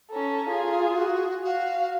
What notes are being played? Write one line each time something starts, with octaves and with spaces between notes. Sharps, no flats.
C#4 A4 A#5
F4 G#4
F#4
F#4 F5